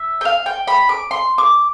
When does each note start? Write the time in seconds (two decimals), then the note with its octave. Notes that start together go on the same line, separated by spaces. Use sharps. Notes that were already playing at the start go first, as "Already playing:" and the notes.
Already playing: E5
0.21 G5
0.25 F5
0.46 G5
0.68 B5
0.89 D6
1.11 C6
1.38 D6